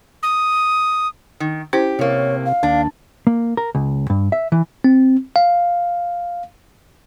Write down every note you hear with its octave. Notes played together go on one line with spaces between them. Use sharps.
D#6
D#3
C#4 E4 G4 C5
A2 C3 A#3 C#5
F5
D#2 D4
A#3
A#4
C#2
G2
E5
E3
C4
F5